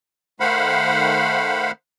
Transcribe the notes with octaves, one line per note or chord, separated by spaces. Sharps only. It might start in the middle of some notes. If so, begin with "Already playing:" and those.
D#3 A3 C5 F5 F#5 B5